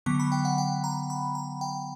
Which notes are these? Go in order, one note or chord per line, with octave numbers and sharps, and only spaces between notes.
D3 F#3 B3 C#6
B5
G5
F#5
G5
A#5
B5
A#5
G5